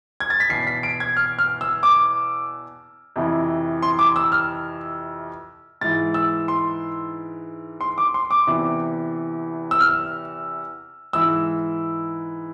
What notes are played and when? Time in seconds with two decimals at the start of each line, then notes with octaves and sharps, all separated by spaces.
0.20 G#6
0.30 A6
0.40 B6
0.50 E2 B2 C7
0.67 B6
0.83 D7
1.00 G#6
1.17 F6
1.39 F6
1.61 E6
1.83 D6
3.16 F2 C3 E3
3.83 C6
3.99 D6
4.16 E6
4.32 F6
5.81 G#2 E3 A6
6.14 E6
6.48 C6
7.81 C6
7.98 D6
8.14 C6
8.31 D6
8.47 E2 C3 E3
9.71 E6
9.80 F6
11.13 G#2 E3 E6